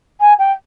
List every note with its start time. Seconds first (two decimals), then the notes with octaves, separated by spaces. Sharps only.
0.21 G#5
0.39 G5